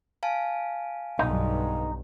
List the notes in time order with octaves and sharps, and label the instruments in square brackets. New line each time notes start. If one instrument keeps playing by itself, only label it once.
[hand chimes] F5 G#5 A5
[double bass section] B1 G2 [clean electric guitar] D#4